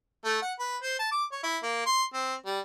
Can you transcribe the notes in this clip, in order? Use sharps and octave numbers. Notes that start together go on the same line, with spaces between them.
A3
F#5
B4
C5
A5
D6
C#5
E4
A#3
C6
C4
G3